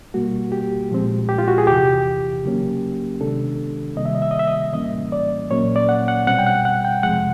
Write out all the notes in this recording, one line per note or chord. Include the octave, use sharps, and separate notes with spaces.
B2 G3 A#3 F#4
G4
A#2 F3 G#3 C4
G4
F4
F#4
G#4
E2 C3 E3 G4
C#3 F#3 A#3 C#4
C3 D#3 G#3 B3 D4 A4
C3 D#3 G3 A#3 D#5
E5
D#5
E5
D#5
E5
D#5
A2 E3 G3 A#3 C#4 D#5
D5
A#2 F#3 A#3 C#4 C#5
D5
F#5
F#5
B2 G3 C4 F#5
G5
F#5
F#5
G5
F2 C3 F3 G#3 F#5